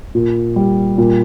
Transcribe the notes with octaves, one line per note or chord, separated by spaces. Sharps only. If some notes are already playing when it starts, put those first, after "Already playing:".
A#2
G3
A#2